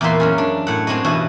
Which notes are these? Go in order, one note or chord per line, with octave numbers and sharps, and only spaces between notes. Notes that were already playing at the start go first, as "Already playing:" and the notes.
E2 A#2 A#3 B4 E5 C6
F#2 G#3 C#4
D4
A2 F#5
G#3 C4 D4 F#4 C#5 D#5
G2 B2 E3 F#4 D#5 G#5